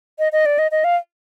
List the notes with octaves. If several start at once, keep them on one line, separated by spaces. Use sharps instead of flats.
D#5
D#5
D5
D#5
D#5
F5